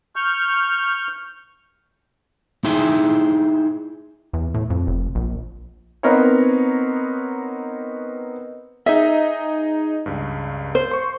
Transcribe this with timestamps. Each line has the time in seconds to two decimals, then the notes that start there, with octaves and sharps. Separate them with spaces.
0.16 C#6 F6 G6
2.64 D#4 E4 G#4 C5 E5 G5
4.33 E2
4.54 A2
4.70 F2
4.87 F1
5.15 A#1
6.03 B3 C4 D#4 A#4 B4 C#5
8.86 D#4 G#4 D#5 E5
10.06 C#2 G2
10.75 C5
10.91 C6 C#6